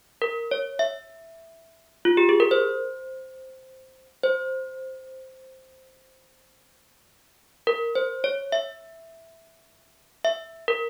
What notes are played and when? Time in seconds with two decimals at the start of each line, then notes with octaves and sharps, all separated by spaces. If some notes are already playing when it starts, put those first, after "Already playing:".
0.22 A#4
0.51 C#5
0.79 E5
2.05 F4
2.17 G4
2.29 G#4
2.40 A#4
2.51 C5
4.23 C5
7.67 A#4
7.95 C5
8.24 C#5
8.52 E5
10.25 E5
10.68 A#4